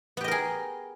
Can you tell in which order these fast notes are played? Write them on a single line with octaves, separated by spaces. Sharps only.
B3 G4 D#5 A#4 G#4